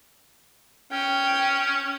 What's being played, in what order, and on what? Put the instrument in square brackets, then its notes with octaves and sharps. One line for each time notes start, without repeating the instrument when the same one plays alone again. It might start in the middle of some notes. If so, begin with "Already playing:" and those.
[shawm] C#4 [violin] G5